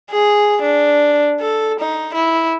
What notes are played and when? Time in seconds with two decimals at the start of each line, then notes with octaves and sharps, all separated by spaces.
0.11 G#4
0.62 D4
1.41 A4
1.80 D#4
2.14 E4